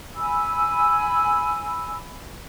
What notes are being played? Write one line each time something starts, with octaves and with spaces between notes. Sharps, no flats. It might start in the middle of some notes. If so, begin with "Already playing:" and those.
G#5 B5 E6